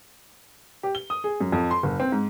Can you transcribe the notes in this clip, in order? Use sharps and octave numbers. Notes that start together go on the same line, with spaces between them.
G4
G7
D#6
G#4
F#2
F2
C6
F#1
C4
G#2